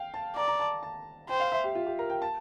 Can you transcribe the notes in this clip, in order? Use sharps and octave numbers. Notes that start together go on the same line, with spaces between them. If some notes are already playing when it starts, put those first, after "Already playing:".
Already playing: F5 G5
A5
D5 A#5
A#5
A5
A5
C5 G5
F5
E5
G4
F4
G4
A#4
G5
A5